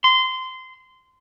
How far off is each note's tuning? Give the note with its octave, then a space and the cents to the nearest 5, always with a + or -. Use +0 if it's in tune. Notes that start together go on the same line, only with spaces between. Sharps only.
C6 -20